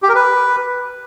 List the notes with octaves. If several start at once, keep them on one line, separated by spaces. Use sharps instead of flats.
G4
A#4
B4